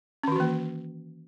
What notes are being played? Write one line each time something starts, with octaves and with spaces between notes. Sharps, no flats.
D#3 E3 A#3 C#4 F#4